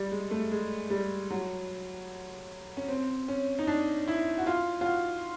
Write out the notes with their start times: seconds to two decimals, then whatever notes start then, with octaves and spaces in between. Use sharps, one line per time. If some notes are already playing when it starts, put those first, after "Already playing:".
Already playing: G3
0.11 G#3
0.31 A3
0.51 G#3
0.90 G3
1.31 F#3
2.77 C#4
2.88 C4
3.28 C#4
3.59 D#4
3.67 D4
4.08 E4
4.38 F#4
4.47 F4
4.81 F4
4.86 F#4